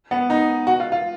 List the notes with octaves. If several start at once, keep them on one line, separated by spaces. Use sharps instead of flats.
B3
D#4
F#4
F4
F4